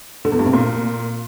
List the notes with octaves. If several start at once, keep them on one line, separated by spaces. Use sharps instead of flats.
D3
E2
G2
C3
A#2